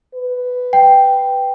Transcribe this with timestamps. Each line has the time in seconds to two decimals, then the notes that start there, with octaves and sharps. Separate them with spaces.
0.15 B4
0.73 G5